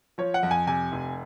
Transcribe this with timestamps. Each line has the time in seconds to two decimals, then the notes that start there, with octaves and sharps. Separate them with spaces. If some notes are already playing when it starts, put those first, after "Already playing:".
0.18 F3 C#5
0.34 F#5
0.43 F2
0.51 G#5
0.67 C3 G#5
0.92 F1